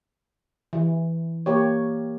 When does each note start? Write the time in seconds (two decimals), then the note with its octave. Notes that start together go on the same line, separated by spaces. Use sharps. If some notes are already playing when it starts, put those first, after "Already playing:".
0.73 E3
1.46 A#3 G4 C#5